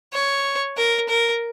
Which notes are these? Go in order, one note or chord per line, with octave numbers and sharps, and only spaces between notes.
C#5
A#4
A#4